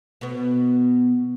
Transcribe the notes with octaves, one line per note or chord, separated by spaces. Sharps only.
B2 B3